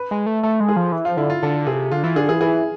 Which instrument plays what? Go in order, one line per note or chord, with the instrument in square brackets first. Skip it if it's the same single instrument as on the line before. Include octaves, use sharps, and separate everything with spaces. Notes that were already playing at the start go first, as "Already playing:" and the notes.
Already playing: [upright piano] B4
[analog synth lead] G#3
A3
[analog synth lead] A3 [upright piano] A4
[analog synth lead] G#3
[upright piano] G#4
[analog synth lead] F3
E3
[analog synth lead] F3 [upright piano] F4
[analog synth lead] D3 [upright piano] E4
[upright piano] F4
[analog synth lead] D3 [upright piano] A4
[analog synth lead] C3 [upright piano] G#4
[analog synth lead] D3 [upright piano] F4
[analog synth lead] E3 [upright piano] F4
[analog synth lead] D3 [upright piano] G#4
[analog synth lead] E3 [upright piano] G#4
[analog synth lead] E3 [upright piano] G#4